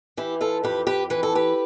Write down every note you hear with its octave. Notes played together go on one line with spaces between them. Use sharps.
E3 E4 G4
F4 A4
F2 G4 B4
G4 B4
E3 B4
A4
G4 B4